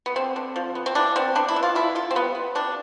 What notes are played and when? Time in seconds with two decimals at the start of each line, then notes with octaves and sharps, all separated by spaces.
0.06 B3
0.16 D3 C4
0.36 D3
0.56 F3
0.75 B3
0.86 C4
0.95 E3 D4
1.16 B3 C4
1.35 B3 D4
1.48 E4
1.56 E3
1.63 F4
1.75 D3 E4
1.95 D3 F4
2.11 C4
2.15 G3 B3
2.35 B3
2.55 C3 D4